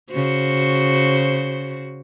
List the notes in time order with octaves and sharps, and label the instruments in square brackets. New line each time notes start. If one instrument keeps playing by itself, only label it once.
[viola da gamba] C#3 F#4 C5